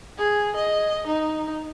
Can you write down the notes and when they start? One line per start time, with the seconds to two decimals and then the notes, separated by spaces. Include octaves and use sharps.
0.18 G#4
0.56 D#5
1.07 D#4